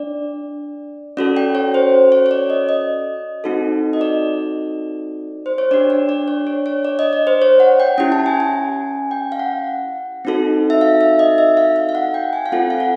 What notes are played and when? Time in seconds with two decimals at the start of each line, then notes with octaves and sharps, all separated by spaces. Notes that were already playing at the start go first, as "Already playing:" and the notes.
Already playing: D4 D5
1.17 C#4 F#4 A4 D5
1.37 G5
1.55 C#5
1.74 C5
2.12 C#5
2.26 C#5
2.31 D5
2.50 D#5
2.69 D#5
3.44 C4 D#4 F#4 A4
3.93 D#5
4.01 D5
5.46 C5
5.58 C#5
5.71 D4 G4 D5
5.90 D5
6.09 D5
6.28 C#5
6.47 C#5
6.66 C#5
6.85 D5
6.99 D#5
7.13 D5
7.27 C5
7.42 C#5
7.60 F#5
7.80 G5
7.98 C#4 E4 G4 G5
8.12 A5
8.26 G#5
8.40 G#5
9.11 G5
9.32 F5
9.39 F#5
10.25 C4 D#4 F#4 A4
10.70 E5
10.81 F5
11.01 E5
11.19 D#5
11.38 E5
11.57 F5
11.76 F5
11.89 F5
11.95 F#5
12.14 G5
12.33 G#5
12.46 F5
12.52 C4 F4 A4 F#5
12.70 F5
12.80 F#5